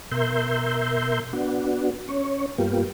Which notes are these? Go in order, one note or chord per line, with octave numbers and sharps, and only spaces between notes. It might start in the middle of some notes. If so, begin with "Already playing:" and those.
B2 A#4 E5 C6 G6
B3 D4 F#4
C#4 C#5
G2 A#3 B3 F4 G4